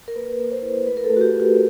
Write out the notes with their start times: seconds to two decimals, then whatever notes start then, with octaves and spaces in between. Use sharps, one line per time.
0.08 A#4
0.16 A#3 B4
0.39 A#3
0.52 C5
0.62 E4
0.86 A3 B4
0.97 A#4
1.04 A4
1.10 A3
1.16 F#4
1.21 G4
1.34 F4
1.40 G4